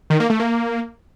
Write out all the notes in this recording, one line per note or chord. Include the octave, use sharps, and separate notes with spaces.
D#3
A#3
A3
A#3